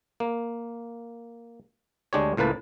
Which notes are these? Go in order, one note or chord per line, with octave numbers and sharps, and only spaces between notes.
A#3
D2 G#3 D4 G4 C#5
C#2 A2 A#3 B4 A5